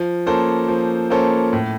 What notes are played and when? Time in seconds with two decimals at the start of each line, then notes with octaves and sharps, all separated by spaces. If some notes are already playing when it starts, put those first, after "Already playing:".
Already playing: F3
0.26 A#3 C#4 A4 C5
0.68 F3
1.10 A#3 C#4 A4 C5
1.53 A2